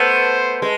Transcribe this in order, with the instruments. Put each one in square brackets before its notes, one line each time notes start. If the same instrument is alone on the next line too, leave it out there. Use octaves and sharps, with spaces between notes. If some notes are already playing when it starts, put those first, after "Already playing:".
Already playing: [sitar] A3 B3 [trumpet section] C5
[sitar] G#3